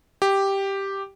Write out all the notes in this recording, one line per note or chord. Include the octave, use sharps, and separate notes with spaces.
G4